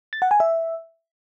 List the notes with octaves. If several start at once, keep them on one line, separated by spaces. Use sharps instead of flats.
A6
F#5
G#5
E5